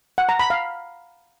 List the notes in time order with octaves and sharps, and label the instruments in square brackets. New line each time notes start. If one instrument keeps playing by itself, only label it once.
[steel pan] F#5
A#5
B5
F5